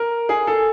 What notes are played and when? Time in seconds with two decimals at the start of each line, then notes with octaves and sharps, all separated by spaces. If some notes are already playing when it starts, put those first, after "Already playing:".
Already playing: A#4
0.29 G#4
0.47 A4